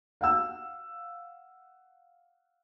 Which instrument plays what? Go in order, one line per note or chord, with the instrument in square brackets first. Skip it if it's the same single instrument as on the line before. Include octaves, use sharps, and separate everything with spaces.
[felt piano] F5 F#5 E6